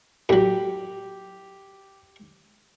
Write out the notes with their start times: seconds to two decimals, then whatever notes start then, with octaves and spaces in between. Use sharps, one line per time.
0.29 A2 F#3 G4